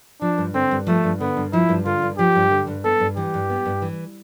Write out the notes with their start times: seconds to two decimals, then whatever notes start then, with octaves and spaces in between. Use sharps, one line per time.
0.21 F3 D4
0.38 G2
0.54 D3 C4
0.71 G2
0.87 F3 A3
1.04 G2
1.20 D3 B3
1.37 G2
1.53 F3 E4
1.69 G2
1.85 D3 F4
2.02 G2
2.18 F3 G4
2.35 G2
2.51 D3
2.67 G2
2.84 B3 A4
3.00 G2
3.17 E3 G4
3.34 G2
3.50 B3
3.66 G2
3.82 E3